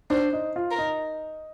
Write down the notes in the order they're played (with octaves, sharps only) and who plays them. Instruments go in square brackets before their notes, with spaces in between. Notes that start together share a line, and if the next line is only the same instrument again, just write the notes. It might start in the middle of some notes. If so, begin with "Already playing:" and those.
[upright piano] D4 [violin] C5
[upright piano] D#4
F4
[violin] A#4
[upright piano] D#4